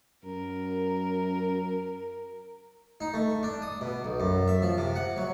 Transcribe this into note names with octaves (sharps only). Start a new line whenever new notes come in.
F#2 A#4
D#4
A3
D4
D#6
B2
B1
F#2
E5
F3
C3
F#5
F#3